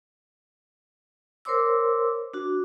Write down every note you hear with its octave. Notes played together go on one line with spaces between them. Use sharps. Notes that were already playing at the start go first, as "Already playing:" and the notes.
A#4 C5 C#5 C6 D6 E6
D4 F#4